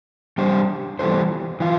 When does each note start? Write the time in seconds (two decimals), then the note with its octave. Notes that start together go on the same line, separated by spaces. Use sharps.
0.38 G3 D4 G4 C5
0.99 E3 G3 D4 A4 C5
1.60 E3 F4